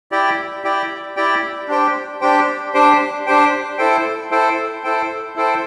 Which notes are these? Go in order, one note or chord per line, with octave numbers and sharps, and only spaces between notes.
E4 G4 D5 G5
E4 G4 D5 G5
E4 G4 D5 G5
D4 G4 C5 G5
D4 G4 C5 G5
D4 G4 C5 G5
D4 G4 C5 G5
E4 A4 C5 G5
E4 A4 C5 G5
E4 A4 C5 G5
E4 A4 C5 G5